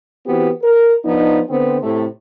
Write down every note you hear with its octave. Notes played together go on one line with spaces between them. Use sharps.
E3 B3 C4 F#4 G4
A#4
F3 B3 D4 D#4
D3 B3 C4
A2 C3 A3